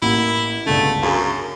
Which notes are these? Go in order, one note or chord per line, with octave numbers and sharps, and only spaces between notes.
A1 A#3 E4 F#5
G1 C#2 D3 A3
F#2 G#4 F5